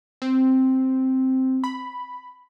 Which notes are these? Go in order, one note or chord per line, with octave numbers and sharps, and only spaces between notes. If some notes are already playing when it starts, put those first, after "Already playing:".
C4
B5